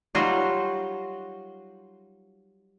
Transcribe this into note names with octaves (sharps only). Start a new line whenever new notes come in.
F#3 G3 D#4 F4 F#4 C5